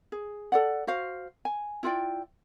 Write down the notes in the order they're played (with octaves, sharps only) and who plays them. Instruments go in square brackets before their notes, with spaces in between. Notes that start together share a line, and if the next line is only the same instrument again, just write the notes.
[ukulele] G#4
A4 D5 F#5
F#4 C5 F5
G#5
E4 F4 D5 G5